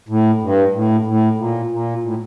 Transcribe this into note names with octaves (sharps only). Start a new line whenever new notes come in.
A2
G2
A2
A2
A#2
A#2
A2